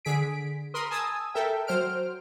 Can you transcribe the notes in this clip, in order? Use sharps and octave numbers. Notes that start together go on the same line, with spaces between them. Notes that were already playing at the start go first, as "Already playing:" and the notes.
D3 G#4 B6 D7
A#4 B5 C6 D#6
G#5 A5 D#6 E6
A4 A#4 E5 G5
F#3 C5 F6 D7